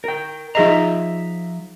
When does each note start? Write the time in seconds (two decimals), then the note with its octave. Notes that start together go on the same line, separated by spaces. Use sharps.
0.04 A#4 G5
0.55 F3 D#4 G#4 D#5 E5 A#5